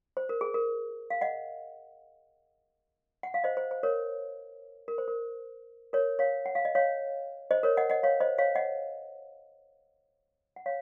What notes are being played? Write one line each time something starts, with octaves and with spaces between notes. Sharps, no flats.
C5
A#4
G#4
A#4
F5
D#5 F#5
F#5
F5
C5 D#5
C5
C5
A#4 C#5
A#4
C5
A#4
A#4 C#5
C#5 F5
F#5
F5
D#5
C#5 F5
C5 D#5
A#4 C#5
D#5 F#5
D#5 F#5
C#5 F5
C5 D#5
C#5 F5
D#5 F#5
F#5
C#5 F5